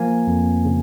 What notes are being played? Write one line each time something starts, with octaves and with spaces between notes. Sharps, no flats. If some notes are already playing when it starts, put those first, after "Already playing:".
Already playing: F3 A#3 G#5
F2
C#3